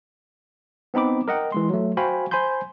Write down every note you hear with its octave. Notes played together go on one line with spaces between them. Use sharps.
B3 C4 D#4 B5 D6
A#4 D#5 F#5 G5
E3 G#3 C6
F#3 A3
F#4 C5 F5 G5 G#5 B5
C5 G#5 B5 C6 G6